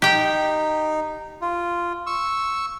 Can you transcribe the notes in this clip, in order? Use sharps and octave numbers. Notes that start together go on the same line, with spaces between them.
D#4 G4 G5
F4
C#6 E6